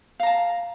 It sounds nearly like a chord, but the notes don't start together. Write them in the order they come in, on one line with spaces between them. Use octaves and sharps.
F5 A#5 A5